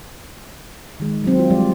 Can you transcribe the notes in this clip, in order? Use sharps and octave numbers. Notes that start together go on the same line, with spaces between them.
D#3 G#3
F#3 C4
F4
F3 G3 G#3 D5